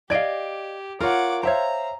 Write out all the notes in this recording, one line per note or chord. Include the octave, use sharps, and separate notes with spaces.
G4 D5 D#5 F5 G#6 D7
F4 A#4 C#5 F#5 D6
C5 C#5 E5 F5 G5 A#5